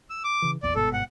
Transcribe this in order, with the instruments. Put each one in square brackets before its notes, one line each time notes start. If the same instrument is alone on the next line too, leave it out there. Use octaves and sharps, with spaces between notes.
[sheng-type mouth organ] E6
D6
[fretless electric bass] C#3 E3
[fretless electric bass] A#1 E2 [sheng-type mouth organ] D5
[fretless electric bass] G1 G#2 B2 [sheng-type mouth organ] A4
[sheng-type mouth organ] F#5